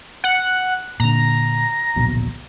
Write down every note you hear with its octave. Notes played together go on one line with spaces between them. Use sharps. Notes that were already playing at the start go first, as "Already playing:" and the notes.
F#5
A#2 D3 A#5
D1 A#1 B2